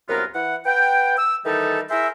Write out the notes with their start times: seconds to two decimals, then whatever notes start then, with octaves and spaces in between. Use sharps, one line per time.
0.08 C2 F#2 B3 F4 A#4
0.35 E3 E4 F#5
0.66 B4 F#5 G5
1.18 E6
1.45 D#3 E3 G3 D#4 A4
1.90 E4 G#4 A#4 C5 E5